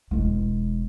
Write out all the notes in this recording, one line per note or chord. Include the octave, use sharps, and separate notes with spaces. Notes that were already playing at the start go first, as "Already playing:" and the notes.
E1 G#3